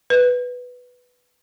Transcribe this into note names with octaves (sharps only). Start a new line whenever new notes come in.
B4